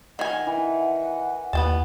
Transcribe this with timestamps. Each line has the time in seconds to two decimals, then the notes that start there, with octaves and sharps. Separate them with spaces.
0.19 D#3 F#5 G#5
0.47 E3
1.53 D#2 B3 G5 A5